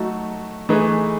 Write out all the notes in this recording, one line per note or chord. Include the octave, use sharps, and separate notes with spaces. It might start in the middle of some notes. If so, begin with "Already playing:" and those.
Already playing: F#3 A3 D#4 F#4 A4
E3 A3 D#4 G#4 B4